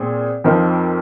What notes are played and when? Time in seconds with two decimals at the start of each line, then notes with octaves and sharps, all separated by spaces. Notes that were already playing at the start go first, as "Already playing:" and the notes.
Already playing: A#2 C4 G#4
0.44 F2 F3 C4 D#4 A#4